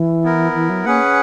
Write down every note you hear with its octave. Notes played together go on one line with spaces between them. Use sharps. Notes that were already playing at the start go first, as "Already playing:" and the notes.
Already playing: E3
B3 E4 A#4
E3
F#3
A#3 C#4 G#4 B4 F#5